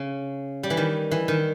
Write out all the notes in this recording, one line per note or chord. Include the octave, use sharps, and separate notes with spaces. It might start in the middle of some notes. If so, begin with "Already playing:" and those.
Already playing: C#3
G3
E3
D#3
E3
D#3